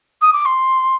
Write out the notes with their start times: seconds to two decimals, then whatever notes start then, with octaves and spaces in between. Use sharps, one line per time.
0.21 D#6
0.33 D6
0.45 C6